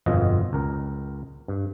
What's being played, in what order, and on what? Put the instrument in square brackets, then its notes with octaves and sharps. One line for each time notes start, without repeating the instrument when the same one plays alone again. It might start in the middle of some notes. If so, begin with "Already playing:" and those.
[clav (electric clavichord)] G1 F2 B2 F4 D#5
C#2 A#4
G2